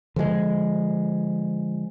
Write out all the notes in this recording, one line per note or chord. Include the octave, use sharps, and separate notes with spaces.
D3 F3 G3 G#3